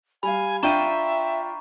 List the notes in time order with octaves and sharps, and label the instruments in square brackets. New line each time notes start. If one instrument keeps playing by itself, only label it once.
[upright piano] G3 F5 [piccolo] G#5 [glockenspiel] B5
[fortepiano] D4 G5 [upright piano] F4 G6 D#7 [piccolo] E5 [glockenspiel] A#5 C#6